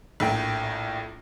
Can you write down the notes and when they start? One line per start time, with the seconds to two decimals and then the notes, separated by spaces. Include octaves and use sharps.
0.20 A#1 A2 G5